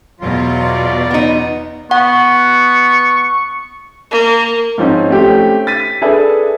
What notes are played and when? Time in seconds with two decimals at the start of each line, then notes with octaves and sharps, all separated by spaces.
0.20 E2 B2 F#3 F4
0.60 D5
1.11 B3 D#4
1.91 B3 F#5 C#6
4.12 A#3
4.78 G#2 F3 C4 C#4 D#4
5.10 A3 C4 C#4 G4
5.67 A6 B6 D#7
6.02 D4 G#4 A4 B4 E5